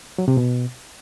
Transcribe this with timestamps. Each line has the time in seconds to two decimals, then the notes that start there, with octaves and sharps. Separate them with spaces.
0.18 F#3
0.28 C3
0.37 B2